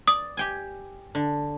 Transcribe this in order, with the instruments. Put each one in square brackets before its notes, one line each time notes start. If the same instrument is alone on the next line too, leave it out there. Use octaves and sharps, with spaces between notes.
[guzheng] D5 [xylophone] D#6
[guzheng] G4 G5 G#5
D3